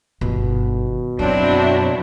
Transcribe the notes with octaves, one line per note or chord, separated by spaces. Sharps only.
G1 B2 D#3
F#2 F#3 C4 D4 E4